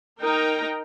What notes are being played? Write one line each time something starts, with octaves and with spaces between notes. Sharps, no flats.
D#4 A#4 G5 A#5